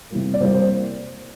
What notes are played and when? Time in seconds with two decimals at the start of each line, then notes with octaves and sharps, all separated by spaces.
0.10 C3 E3 G3 A#3
0.34 D5
0.40 C3 E3 G3 A#3 C5
0.55 C5